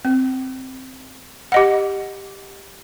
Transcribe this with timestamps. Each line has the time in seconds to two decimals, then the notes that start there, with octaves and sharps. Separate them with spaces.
0.05 C4
1.52 G4 D#5 F#5